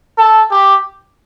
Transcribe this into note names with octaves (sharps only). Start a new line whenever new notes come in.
A4
G4